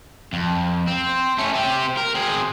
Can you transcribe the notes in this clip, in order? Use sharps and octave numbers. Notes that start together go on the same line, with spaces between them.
F2
C4
A3 C#4
C4 G4
A#4
C4 G#4